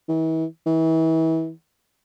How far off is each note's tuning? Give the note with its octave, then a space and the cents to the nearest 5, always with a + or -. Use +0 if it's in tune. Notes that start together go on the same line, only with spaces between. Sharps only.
E3 -40
E3 -35